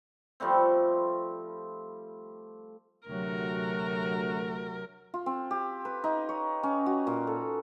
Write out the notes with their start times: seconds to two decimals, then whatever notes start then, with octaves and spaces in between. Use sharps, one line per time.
0.40 F3 G3 A3 C4
3.08 D2 C3 F#3 A3 F#4 A#4
5.14 F4
5.26 C4
5.51 G4
5.85 B4
6.04 D#4
6.29 C#5
6.63 C#4
6.86 F#4
7.07 A#2
7.27 A4